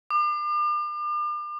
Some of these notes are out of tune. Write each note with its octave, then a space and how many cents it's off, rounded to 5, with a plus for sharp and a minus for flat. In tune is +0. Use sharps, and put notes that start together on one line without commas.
D6 +40